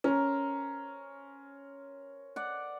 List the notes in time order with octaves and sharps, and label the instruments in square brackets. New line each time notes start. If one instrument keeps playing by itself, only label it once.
[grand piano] C#4 [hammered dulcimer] A#4 C5
[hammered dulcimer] D5 F#5